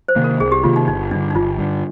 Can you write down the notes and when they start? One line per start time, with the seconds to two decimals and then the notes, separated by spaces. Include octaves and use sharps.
0.08 C5
0.16 C3 D#3 A#3
0.24 A#4
0.40 C2 G#4
0.52 G4
0.64 C3 D#3 A#3 F4
0.76 D#4
0.88 G1 D#4
1.11 G2 D3 D4
1.30 D#4
1.35 G1 F4
1.58 G2 D3